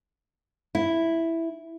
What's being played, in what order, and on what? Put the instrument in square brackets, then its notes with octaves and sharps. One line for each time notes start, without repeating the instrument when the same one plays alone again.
[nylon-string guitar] E4